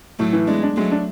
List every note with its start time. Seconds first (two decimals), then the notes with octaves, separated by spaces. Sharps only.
0.19 A2 F#3 A3
0.33 E3
0.47 G#3 B3 D4
0.63 D4
0.76 F#3 G#3 A3
0.92 D4